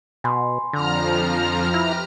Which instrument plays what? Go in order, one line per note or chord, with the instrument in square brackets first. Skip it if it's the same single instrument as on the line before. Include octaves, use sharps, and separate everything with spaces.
[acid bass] B2 [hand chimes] G#5 B5 C6
[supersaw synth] F2 F3 [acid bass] D3 [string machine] A#5 F6
[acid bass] E4 [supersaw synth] G4 B4